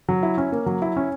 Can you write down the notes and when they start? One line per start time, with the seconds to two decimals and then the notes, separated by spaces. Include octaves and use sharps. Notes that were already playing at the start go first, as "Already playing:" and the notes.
0.08 F#3
0.23 E4
0.38 C#4
0.52 A#3
0.66 F#3
0.82 E4
0.96 C#4